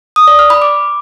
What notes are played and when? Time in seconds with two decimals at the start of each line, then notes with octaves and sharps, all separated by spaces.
0.16 D#6
0.27 D5
0.39 F6
0.50 B5
0.62 D6